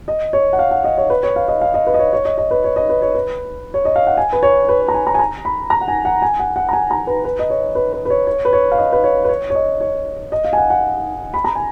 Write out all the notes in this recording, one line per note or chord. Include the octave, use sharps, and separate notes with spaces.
D#5
C#5
F#5
F5
F#5
D#5
C#5
B4
C#5
F5
D#5
F5
D#5
B4
D#5
C#5
C#5
D#5
D#5
B4
C#5
D#5
B4
C#5
B4
C#5
D#5
F5
F#5
G#5
B4
C#5
B4
C#5
A#5
G#5
A#5
G#5
A#5
B5
A#5
F#5
G#5
F#5
G#5
F#5
F#5
A#5
G#5
A#5
B4
B4
D#5
C#5
B4
B4
B4
C#5
C#5
B4
C#5
F5
D#5
B4
C#5
B4
C#5
C#5
D#5
C#5
D#5
F5
G#5
F#5
F#5
B5
A#5
G#5